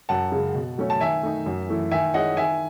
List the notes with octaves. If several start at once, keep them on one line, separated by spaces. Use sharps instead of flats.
F#2 F#5 A5
C#3 G#3
B2
F#3 A3 C#4
A5
D#3 E5 G#5
A3 D#4
F#2
E3 A3 E4
D#3 E5 G#5
G#3 C#4 E4 D#5 F#5
D#3 E5 G#5